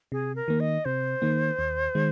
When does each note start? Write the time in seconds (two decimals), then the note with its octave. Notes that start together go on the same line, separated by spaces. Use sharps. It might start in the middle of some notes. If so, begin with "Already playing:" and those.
0.12 C3 G#4
0.36 A#4
0.48 D#3 A#3
0.60 D#5
0.85 C3 C5
1.22 D#3 A#3
1.59 D#2
1.95 D#3 G#3